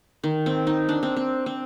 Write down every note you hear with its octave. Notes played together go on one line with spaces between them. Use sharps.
D#3
C4
D#4
D4
C4
C4
C4